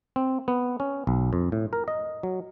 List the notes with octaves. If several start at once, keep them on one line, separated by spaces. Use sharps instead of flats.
C4
B3
C#4
B1
F2
A2
A#4
D#5
F#3